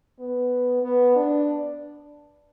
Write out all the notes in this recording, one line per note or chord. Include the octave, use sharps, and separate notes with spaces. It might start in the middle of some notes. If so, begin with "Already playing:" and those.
B3
B3
D4